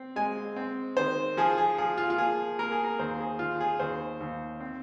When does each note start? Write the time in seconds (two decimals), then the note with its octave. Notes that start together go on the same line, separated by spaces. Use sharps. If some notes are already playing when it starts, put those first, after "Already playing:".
Already playing: C4
0.16 G#3 G#5
0.56 C4
0.97 D#3 C5
1.37 F3 G#4
1.58 G#4
1.78 F3 G#4
1.98 F4
2.10 F4
2.18 A#3 G#4
2.59 A#3 A#4
2.72 G#4
2.84 A#4
2.99 D#2 C5
3.20 G#4
3.39 D#2 F4
3.60 G#4
3.79 D#2 C5
4.21 D#2
4.60 C4